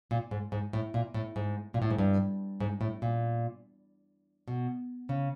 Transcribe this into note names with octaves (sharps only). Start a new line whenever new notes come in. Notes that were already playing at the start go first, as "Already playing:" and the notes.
A#2
G#2
G#2
A2
A#2
A2
G#2
A#2
A2
G#2
G2
G#2
A2
A#2
B2
C#3